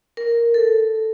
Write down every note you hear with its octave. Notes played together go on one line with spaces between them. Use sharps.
A#4
A4